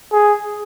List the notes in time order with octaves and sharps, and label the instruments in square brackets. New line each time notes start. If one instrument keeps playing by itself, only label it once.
[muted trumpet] G#4